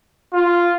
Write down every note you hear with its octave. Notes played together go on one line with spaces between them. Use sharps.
F4